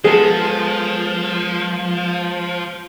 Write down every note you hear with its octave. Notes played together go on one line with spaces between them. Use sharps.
F3 G#3 B3 G#4 A4